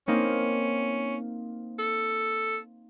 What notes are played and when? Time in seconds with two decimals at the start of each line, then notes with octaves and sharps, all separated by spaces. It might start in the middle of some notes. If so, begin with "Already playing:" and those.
0.08 A#3 C4 C#4 D#4
1.79 A4